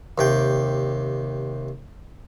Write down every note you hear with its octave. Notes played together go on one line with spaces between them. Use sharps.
D#2 C3 G5